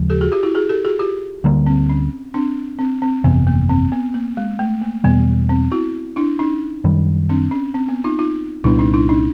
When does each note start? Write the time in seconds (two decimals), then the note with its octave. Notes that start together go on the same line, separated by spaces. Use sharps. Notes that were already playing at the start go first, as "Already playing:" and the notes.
Already playing: D#2 C#3 F3 G#3
0.10 G4 A4
0.21 F#4 G#4
0.32 F4 G4
0.43 E4 F#4
0.55 F#4 G#4
0.69 G4 A4
0.85 F#4 G#4
0.99 F4 G4
1.44 D2 D3 G3 A#3
1.66 C4
1.89 C#4
2.34 C4 D4
2.79 C4
3.02 C4
3.24 G1 F2 C3 E3 B3
3.47 A#3
3.69 C4
3.92 B3
4.14 A#3
4.37 G#3
4.59 A3
4.81 A#3
5.04 E2 B2 G3 B3
5.49 C4
5.72 E4 F#4
6.16 D4 E4
6.39 C#4 D#4
6.84 F#2 D#3 G3
7.29 C4 D4
7.51 C#4
7.74 C4
7.89 B3
8.04 D#4 F4
8.19 D#4 F4
8.64 C2 A#2 G3 B3 D4 E4
8.79 C#4 D#4
8.94 D4 E4
9.09 C#4 D#4